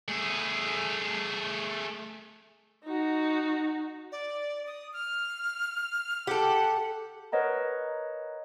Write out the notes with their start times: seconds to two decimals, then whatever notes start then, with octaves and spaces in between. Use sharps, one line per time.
0.08 A3 G#4
2.84 D#4 F#4
4.12 D5
4.67 D#6
4.93 F6
6.27 G4 A4 F#5
7.32 A#4 B4 C#5 D#5 F#5 A#5